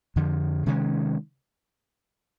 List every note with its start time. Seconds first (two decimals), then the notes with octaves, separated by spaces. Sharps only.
0.16 F2 D3 F3
0.66 C3 D#3 G#3 C#4